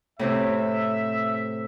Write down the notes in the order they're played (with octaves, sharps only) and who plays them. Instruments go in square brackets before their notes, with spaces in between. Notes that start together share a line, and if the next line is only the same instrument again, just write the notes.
[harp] A2 C3 C4 [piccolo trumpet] E5